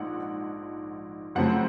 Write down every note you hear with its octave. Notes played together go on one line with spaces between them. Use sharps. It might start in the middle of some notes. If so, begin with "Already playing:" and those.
Already playing: A#1 G#2 F3 F#5
F#2 C#3 F3 A3 C4 F#5